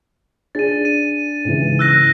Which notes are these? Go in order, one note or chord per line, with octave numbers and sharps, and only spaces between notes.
D4 G#4 A6 D#7
D#7
G#2 C#3 E3
E6 F#6 A#6